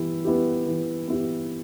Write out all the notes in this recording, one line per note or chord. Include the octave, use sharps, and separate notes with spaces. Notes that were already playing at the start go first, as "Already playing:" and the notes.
Already playing: E3 B3 E4 G4
B3 E4 G4
E3
B3 E4 G4